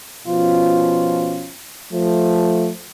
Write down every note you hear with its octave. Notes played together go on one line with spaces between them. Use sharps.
B2 F3 C#4 F4
F3 A3